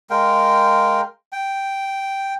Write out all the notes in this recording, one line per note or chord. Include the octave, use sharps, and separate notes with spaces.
G#3 A#4 F5 G5
G5